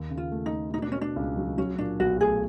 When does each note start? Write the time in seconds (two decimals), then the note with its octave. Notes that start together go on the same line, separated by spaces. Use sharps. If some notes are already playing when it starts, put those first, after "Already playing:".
Already playing: D#2
0.10 C#3
0.17 F4
0.32 A3
0.46 D#4
0.52 A3
0.74 B2 D#4
0.82 D4
0.92 B2 C#4
1.01 D4
1.16 C#2
1.37 F#3
1.58 F#3 C#4
1.78 A#2 D4
2.00 B1 F#4
2.21 A3 G#4